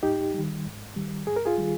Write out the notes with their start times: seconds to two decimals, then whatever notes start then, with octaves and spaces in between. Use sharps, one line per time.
0.03 G#2 D#4 G4
0.34 D#3 G3
0.65 G#2
0.96 D#3 G3
1.27 G#2 G#4
1.36 A#4
1.45 F4 G#4
1.58 D#3 G3